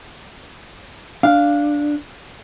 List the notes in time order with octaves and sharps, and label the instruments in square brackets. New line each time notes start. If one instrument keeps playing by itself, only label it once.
[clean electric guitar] D4 [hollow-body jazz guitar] F5